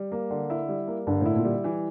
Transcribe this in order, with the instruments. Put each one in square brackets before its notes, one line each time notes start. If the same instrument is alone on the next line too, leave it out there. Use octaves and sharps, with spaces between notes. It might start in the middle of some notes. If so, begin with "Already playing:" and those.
Already playing: [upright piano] G3
A#3
D3
E4
G3
A#3
[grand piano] G2 [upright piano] D3
[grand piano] A2 [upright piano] E4
[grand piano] A#2
[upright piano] G3
E3